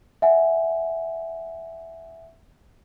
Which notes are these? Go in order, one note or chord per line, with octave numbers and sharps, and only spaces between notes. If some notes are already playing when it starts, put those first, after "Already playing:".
E5 F#5 G#5